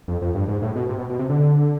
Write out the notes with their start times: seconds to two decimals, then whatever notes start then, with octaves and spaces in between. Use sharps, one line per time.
0.08 F2
0.22 F2
0.35 G2
0.48 G#2
0.62 A2
0.75 B2
0.89 C3
0.99 B2
1.09 B2
1.19 C3
1.29 D3